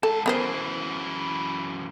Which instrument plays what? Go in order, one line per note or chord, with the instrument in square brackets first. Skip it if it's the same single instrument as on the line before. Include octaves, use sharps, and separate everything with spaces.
[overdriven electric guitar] G#2 A5 [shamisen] A4
[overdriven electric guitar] F#2 E3 [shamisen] B3 A#4 C5